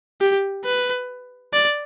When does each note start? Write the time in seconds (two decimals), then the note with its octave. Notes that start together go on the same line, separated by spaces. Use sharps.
0.21 G4
0.65 B4
1.53 D5